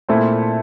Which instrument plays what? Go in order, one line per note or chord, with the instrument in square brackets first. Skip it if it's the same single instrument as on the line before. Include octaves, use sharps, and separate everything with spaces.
[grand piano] A#2 A3 C4 E4